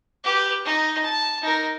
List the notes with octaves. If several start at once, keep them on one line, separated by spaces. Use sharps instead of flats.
G4 B4
D#4
A5
D#4 A#4